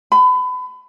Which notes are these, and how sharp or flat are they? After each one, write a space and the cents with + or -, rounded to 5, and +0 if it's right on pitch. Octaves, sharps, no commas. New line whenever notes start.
B5 +30